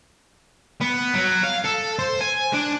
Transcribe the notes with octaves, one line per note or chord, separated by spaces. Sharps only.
B3
F#3
F5
A4
C5
G#5
D4